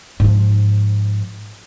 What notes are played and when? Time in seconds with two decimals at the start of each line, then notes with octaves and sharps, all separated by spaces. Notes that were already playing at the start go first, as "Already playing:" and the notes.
0.20 G#2 F3